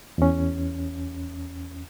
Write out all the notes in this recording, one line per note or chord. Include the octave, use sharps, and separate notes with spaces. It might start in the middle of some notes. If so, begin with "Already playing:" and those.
E2 C#4